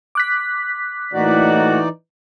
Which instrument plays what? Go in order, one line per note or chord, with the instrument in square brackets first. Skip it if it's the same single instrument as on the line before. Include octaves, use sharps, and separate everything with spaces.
[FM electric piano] D6 F#6 B6
[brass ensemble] A2 A#3 F#4 [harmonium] E3 D#4 D5